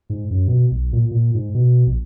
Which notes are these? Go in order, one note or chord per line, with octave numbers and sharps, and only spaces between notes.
G#2
F#2
B2
B1
A#2
A#2
G#2
B2
A#1